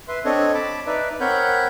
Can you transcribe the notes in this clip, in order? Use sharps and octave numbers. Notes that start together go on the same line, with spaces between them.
B4 E5 C6
C4 D4 A4 C#5 D#5
A5 B5 D6
D#4 B4 D5 E5
C4 A#4 C#5 F#5 B5 G6